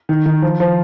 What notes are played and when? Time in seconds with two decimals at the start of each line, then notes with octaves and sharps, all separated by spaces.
0.09 D#3
0.26 D#3
0.42 F3
0.60 F3